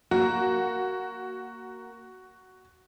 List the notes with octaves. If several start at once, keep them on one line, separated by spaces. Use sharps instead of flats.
A#3 F#4 F#5